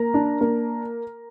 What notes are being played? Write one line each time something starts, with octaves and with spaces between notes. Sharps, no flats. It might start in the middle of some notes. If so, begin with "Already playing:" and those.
Already playing: A#3 A#4 A#5
D4
A#3